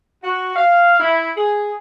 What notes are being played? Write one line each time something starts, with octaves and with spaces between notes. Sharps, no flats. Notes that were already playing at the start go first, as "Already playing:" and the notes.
F#4
F5
E4
G#4